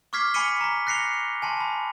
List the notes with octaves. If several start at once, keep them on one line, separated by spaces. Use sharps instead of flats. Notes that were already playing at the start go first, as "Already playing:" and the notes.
C#6 D6 F6 G#6 B6 C7
G#5 B5 B6 C#7 D#7 G7
A#5 B6
F#6 A#6 C7 C#7 F7 G7
G#5 A5 C6
B5